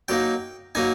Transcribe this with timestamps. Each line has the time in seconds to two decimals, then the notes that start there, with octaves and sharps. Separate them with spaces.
0.08 F#3 A#3 D#4 G5
0.75 F#3 A#3 D#4 G#5